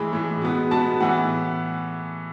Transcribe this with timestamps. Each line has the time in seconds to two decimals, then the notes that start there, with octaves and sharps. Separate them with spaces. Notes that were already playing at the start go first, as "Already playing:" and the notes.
Already playing: A2 E3 G#3 B5
0.13 A2 E3 G#3
0.42 B2 G#3 B3
0.71 B2 G#3 B3 A5
1.00 A2 E3 B3 F#5